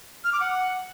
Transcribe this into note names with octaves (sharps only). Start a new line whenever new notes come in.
F6
D6
F#5